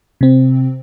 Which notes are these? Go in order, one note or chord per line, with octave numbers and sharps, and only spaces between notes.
C3 C4